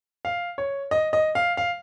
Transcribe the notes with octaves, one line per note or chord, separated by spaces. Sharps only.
F5
C#5
D#5
D#5
F5
F5